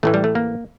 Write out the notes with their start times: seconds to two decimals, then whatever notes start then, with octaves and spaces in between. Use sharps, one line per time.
0.03 A1 A2 E3 A3
0.14 G3
0.24 A3
0.35 A#3